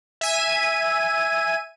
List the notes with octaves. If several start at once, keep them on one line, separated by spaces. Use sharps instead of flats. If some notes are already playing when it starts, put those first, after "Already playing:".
E5 G#5 D#7